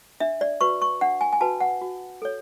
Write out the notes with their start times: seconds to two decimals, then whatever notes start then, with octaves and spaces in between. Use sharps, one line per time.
0.20 D4 E5
0.41 D5
0.61 F#4 B4 C#6
0.82 C#6
1.01 D4 F#5
1.21 G#5
1.33 G#5
1.41 F#4 B4 A5
1.61 F#5
1.82 F#4
2.22 A4 C#5